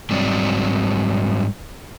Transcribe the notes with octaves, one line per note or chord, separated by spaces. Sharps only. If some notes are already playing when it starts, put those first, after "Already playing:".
G#2 F#3 G3 C4 D5